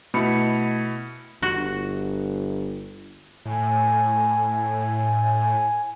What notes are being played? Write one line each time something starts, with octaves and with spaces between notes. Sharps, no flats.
B2 A3 E4 B5 C#7
G1 F#4
A2 G#5